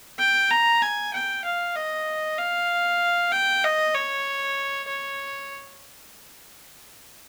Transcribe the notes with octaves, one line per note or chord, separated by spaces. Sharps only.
G5
A#5
G#5
G5
F5
D#5
F5
G5
D#5
C#5
C#5